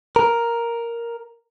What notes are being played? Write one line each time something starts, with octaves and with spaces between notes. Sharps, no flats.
A#4